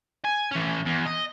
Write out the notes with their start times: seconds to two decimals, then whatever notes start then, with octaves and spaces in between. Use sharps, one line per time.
0.24 G#5
0.51 E3 C#4
0.86 E2
1.06 D#5